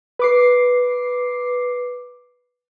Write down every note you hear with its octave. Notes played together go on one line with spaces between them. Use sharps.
B4 D6 C7